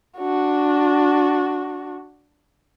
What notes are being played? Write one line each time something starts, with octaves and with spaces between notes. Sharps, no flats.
D4 F#4